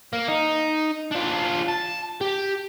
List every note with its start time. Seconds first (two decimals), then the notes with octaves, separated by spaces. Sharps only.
0.13 A#3 A#4
0.28 D#4
1.12 D4 F4
1.68 A5
2.21 G4